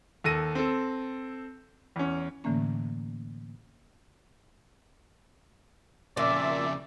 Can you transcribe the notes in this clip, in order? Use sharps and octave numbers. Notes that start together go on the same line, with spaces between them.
D#2 A4 A#6 D#7
C4 A4
E2 C#4
A2 D3 E3 A3 A#3 C#4
F2 A#2 C#3 D5 E5